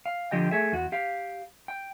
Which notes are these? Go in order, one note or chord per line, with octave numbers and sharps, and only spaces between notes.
F5
D3 F3 G4 D#5 G5
A3 G#4 E5
E2 F#4
G4 F5
G5